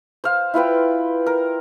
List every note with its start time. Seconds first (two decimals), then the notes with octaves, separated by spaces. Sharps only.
0.24 C5 F5
0.54 E4 F4 B4 G5
1.27 A#4